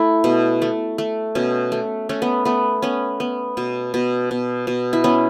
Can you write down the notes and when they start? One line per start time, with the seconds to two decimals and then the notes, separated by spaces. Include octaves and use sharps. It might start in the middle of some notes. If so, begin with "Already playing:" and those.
Already playing: A3 E4
0.24 B2
0.62 A3
0.98 A3
1.35 B2 C#4
1.72 A3
2.09 A3 C#4
2.22 B3
2.45 A3 B3
2.82 B3 C#4
3.20 B3
3.57 B2
3.94 B2
4.31 B2
4.67 B2
4.93 E4
5.04 B3 C#4